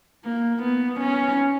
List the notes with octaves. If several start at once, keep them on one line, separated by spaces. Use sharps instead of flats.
A#3
B3
C#4